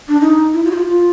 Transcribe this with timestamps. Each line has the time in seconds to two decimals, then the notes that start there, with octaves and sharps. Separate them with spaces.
0.08 D4
0.21 D#4
0.54 E4
0.65 F4
0.71 F#4
0.75 F4
0.86 F4